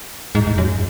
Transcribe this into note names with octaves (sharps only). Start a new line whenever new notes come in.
G#2
G#2
F#2